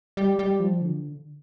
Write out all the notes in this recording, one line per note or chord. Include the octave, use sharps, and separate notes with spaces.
G3
G3
F3
D3